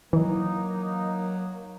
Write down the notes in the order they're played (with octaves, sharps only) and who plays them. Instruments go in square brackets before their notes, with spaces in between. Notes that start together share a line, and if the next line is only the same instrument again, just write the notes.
[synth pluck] E3 [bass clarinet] F#3 [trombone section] A#3 D#4